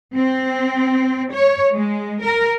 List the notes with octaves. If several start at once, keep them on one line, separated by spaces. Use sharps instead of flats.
C4
C#5
G#3
A#4